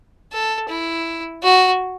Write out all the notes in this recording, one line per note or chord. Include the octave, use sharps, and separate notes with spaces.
A4
E4
F#4